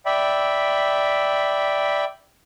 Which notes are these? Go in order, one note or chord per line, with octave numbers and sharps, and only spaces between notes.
D5 E5 G5 B5